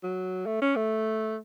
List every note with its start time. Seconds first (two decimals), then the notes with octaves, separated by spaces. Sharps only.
0.03 F#3
0.46 A3
0.62 C#4
0.76 A3